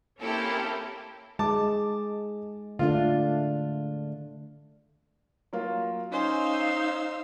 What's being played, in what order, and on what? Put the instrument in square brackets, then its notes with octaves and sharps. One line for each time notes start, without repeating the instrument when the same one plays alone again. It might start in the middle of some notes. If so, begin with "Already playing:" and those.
[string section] A#3 C4 C#4 E4 G4 A4
[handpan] G#3 [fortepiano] A5 D6
[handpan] D3 A3 D4 [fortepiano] F4
[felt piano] F#3 A#3 F4
[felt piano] C#4 G#5 [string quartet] D#4 F5 E6 [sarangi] C5